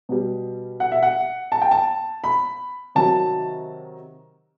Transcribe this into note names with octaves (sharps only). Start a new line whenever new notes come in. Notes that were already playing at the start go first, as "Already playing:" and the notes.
B2 G3
F#5
E5
F#5
A5
G5
A5
B5
C3 D#3 F#3 A5